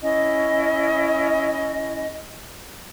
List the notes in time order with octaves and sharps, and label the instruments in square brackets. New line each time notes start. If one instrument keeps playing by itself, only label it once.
[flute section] C#4 E4 D#5